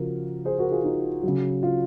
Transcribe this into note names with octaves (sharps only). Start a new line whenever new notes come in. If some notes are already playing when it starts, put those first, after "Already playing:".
Already playing: C#3 F3 F#4 A#4
G#4 C5
F#4 A#4
F4 G#4
D#4
C#3 F#3
F4